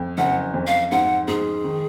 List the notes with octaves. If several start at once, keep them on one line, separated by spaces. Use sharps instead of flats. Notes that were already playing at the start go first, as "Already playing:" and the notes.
Already playing: F2
F#1 F#5
F2
F5
G#2 F#5
G#2 G#4
D#3